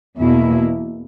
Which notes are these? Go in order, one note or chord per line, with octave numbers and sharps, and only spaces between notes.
E2 B2 A#3 E4